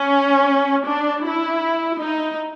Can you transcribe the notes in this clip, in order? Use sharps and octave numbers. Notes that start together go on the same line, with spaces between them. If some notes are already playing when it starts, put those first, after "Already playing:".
Already playing: C#4
D4
E4
D#4